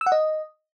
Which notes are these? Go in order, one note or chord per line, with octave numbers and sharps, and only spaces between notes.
E6
F#5
D#5